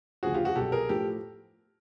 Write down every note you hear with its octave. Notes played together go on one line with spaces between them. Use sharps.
D2 C#3 F3 F#4 G#4
F4 G4
F#4 G#4
C2 B2 F#3 G4 A4
G#4 A#4
A2 F3 G4 A4